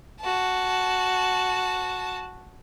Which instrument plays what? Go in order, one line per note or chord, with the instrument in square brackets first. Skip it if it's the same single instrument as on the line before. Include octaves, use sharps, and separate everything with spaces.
[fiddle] F#4 A5